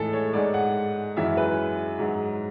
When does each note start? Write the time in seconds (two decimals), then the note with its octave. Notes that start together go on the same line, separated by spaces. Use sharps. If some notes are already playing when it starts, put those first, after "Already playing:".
Already playing: A2 E3 G#3 G#4 A4
0.13 C#5
0.33 G#2 G#3 D5
0.54 F#5
1.17 F#2 E3 G#3 E5
1.37 B4
1.99 G#2 F#3